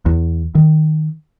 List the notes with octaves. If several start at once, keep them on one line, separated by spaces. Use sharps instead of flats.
E2
D#3